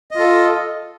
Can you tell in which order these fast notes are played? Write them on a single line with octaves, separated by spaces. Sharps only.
D#5 F4 A4